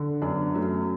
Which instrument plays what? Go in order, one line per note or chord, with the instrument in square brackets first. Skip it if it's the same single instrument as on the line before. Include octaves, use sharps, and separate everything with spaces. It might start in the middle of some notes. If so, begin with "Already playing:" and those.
Already playing: [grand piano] D3
[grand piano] F#2 [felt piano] B3 D4
[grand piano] F#3 [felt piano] A3 C#4